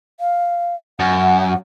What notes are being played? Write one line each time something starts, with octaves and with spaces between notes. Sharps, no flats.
F5
F#2 F#5